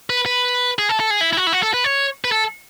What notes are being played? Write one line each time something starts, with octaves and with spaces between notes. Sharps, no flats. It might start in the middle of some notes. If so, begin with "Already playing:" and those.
B4
B4
G#4
A4
A4
G#4
E4
E4
F#4
E4
F#4
A4
B4
C#5
B4
A4